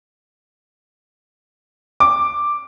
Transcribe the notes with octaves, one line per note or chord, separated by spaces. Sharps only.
D6